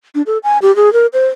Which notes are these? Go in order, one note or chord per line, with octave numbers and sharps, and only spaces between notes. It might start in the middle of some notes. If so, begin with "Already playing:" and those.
D4
A4
G#5
G4
G#4
A#4
C5